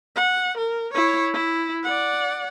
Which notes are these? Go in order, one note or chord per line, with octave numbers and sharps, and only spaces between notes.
F#5
A#4
E4 C#5
E4
D5 F#5